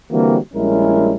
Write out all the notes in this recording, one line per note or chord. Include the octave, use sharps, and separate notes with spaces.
D3 E3 G3 A#3 C4 F#4
A#1 G3 G#3 C#4 E4 A#4